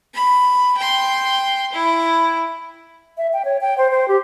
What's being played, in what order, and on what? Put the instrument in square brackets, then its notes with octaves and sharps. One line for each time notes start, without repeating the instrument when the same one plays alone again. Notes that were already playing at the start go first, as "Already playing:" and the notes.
[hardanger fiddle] B5
G5 C6
E4
[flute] E5
G5
C#5
G5
C5
C5
G4